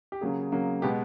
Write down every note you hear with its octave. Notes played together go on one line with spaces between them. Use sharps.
G4
C#3 F#3 A#3 G#4
C#3 F#3 A#3
B2 G#3 B3 G4